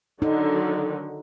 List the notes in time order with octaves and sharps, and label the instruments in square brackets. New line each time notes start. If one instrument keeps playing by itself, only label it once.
[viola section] D3 D#3 F#3 [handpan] D#4